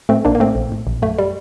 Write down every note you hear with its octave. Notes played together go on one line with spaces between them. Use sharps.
A2 A3 C4
A#1 A#3 D4
A#3
A2 A3 C4
A#1
A2
A#1
F#2 A3
G3